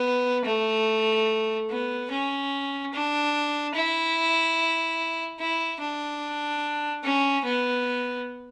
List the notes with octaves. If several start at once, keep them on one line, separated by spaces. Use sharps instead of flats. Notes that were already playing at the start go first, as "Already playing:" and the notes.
Already playing: B3
A3
B3
C#4
D4
E4
E4
D4
C#4
B3